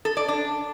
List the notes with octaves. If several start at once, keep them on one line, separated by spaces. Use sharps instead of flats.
A4
D5
D4